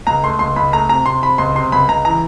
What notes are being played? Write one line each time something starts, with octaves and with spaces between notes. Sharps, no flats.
C#2 A#5
A3 C6
C#2 C6
C#2 B5
A3 A#5
C3 A#5
C3 C6
C3 B5
C#2 C6
C3 C6
C#2 B5
C#2 A#5
E3 A#5